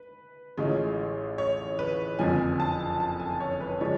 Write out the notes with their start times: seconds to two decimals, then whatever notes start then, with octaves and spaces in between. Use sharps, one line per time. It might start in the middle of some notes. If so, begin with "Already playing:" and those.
Already playing: B4
0.58 A1 A2 G#3 C#4 F4
1.38 C#5
1.79 B4
2.19 F#1 F2 D3 F3 G#5
2.60 A5
3.00 A5
3.20 G#5
3.40 C#5
3.61 B4
3.81 F3 G#3 D4 C#5